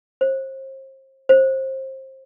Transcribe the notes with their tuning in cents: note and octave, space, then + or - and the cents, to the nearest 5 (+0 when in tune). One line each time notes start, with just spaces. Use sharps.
C5 +35
C5 +25